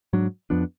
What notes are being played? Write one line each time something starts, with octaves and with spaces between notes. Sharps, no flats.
G#2 F#3 D4
F2 F3 B3 D4